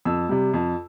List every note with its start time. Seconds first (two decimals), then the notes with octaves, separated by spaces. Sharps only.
0.05 F2 E6
0.29 C3 G3
0.54 F2